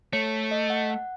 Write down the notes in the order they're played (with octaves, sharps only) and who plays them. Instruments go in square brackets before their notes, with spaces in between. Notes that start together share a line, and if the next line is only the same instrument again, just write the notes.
[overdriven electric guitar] A3 [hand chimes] C#5
[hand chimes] D#5
F#5
F#5